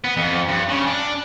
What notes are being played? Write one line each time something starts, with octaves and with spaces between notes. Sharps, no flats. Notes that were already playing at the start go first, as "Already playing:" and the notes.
B3
F2
G2
C#3
D4